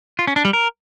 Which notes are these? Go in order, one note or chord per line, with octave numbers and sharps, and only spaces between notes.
F4
C#4
D4
G3
A#4